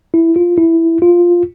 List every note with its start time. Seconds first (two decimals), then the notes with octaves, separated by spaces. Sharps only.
0.14 E4
0.36 F4
0.58 E4
1.02 F4